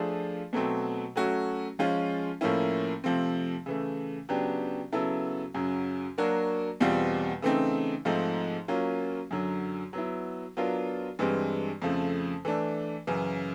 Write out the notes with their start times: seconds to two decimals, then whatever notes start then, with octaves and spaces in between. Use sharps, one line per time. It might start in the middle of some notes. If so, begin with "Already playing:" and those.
Already playing: F3 A3 D4 F4 G#4
0.53 B2 F#3 A3 C4
1.16 F#3 A3 C#4 F#4
1.79 F3 G#3 C#4 F4
2.41 A2 F3 A#3 C#4 E4
3.04 C3 F3 A3 C4
3.66 C#3 E3 A3
4.29 C#3 F#3 B3 D4 G4
4.92 C#3 F#3 B3 E4 A4
5.54 F#2 C#3 F#3
6.18 F#3 A#3 D4 F#4 A#4
6.80 E2 B2 G3 C4 F4
7.42 C#3 E3 A3 C4 D#4
8.05 G#2 F3 A3 C4 D#4
8.68 F#3 A#3 C#4 F4
9.31 F#2 D3 F#3
9.93 F#3 B3 E4
10.57 F#3 B3 D4 F4 A#4
11.19 G2 E3 G#3 C4
11.82 F2 C#3 F3 A3
12.45 E3 A3 D4
13.07 F#2 C#3 E3